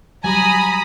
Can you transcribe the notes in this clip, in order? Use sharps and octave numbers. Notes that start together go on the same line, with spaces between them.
F#3 G3 G#5 A#5 B5 D#6